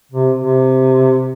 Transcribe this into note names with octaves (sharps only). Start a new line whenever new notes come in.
C3
C3